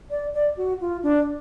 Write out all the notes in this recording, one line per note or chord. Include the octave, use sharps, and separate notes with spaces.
D5
D5
F#4
F4
D4